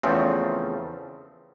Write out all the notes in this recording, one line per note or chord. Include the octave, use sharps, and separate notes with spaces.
E2 C#3 F3 A3 C4